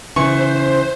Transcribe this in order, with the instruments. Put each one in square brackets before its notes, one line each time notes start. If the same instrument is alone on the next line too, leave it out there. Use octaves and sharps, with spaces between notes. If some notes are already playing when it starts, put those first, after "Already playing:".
[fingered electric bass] C#3 E3 [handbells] B4 E5 G#5 [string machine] C5 [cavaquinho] C#6